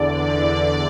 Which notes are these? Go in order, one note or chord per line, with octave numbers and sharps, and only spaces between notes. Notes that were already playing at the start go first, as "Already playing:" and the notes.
Already playing: E2 D3 D5
D5